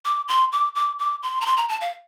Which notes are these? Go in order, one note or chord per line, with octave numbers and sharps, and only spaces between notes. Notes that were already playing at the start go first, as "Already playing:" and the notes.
D6
C6
D6
D6
D6
C6
A#5
C6
A#5
A5
F5